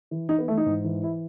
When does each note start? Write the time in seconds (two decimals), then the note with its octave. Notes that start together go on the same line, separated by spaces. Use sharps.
0.11 E3
0.29 E3 D#4
0.39 B3
0.48 E3 A3
0.57 D#4
0.66 G#2
0.84 E3
1.03 E4